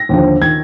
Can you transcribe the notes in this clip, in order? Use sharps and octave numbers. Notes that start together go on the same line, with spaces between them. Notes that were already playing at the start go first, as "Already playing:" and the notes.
Already playing: A#6
D#2 D3 F3
D#3 G#6